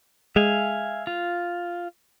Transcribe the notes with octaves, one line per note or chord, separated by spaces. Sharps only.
G#3 E5 F5 G#5
F4